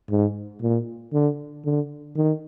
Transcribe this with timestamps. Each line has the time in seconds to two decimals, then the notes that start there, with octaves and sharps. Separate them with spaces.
0.10 G#2
0.62 A#2
1.13 D3
1.65 D3
2.16 D#3